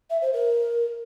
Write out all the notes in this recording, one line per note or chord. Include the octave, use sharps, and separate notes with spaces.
E5
C5
A#4